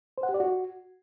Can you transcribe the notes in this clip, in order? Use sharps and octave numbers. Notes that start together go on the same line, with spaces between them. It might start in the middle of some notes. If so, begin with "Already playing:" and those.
C5
F#5
G4
D5
F#4